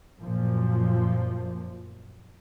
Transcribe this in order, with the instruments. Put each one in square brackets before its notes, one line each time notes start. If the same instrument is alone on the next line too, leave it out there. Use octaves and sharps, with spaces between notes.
[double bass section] F#2 A#2 F3